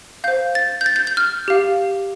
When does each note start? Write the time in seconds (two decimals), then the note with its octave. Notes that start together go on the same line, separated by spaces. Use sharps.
0.24 C5 F5 G6
0.55 A6
0.81 G6
0.86 A6
0.96 G6
1.07 G6
1.17 F6
1.48 G4 F5